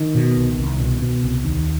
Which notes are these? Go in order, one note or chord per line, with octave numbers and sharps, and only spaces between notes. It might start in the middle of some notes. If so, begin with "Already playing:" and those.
Already playing: D#3
B2
C2
C2
B2
B2
C2
D#2